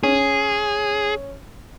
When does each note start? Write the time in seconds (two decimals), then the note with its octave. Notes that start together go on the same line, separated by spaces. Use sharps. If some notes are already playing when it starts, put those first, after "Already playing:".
0.03 C#4 G#4